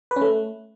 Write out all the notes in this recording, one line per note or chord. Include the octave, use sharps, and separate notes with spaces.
B4
C#4
A3